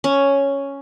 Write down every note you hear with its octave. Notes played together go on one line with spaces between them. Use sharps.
C#4